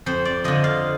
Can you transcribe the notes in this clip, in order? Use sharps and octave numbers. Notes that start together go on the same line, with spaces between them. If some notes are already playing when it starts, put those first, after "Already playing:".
F2 C5
D5
D3 F3 D#5
F5